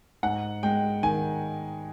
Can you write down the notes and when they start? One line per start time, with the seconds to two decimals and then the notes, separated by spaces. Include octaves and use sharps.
0.23 G#2 F#5
0.63 G#3 G5
1.03 D#3 G#5